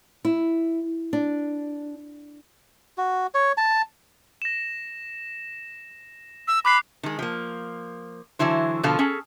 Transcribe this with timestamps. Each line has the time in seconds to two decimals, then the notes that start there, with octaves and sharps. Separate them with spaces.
0.25 E4
1.13 D4
2.98 F#4
3.35 C#5
3.58 A5
4.42 A#6 E7
6.48 E6
6.65 B5 D6 F#6 C7
7.03 D#3 G#3
7.19 F3 A#3
8.39 D3 E3 F#3 E4 C5
8.83 B2 D3 F3 A4 F5
8.99 C#4 G#4 A4